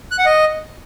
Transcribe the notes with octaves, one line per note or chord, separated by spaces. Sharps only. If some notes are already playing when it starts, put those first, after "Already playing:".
F#6
F#5
D#5